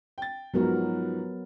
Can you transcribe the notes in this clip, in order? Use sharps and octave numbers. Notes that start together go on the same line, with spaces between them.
G5 A6
G#2 F3 F#3 B3 F#4 A#4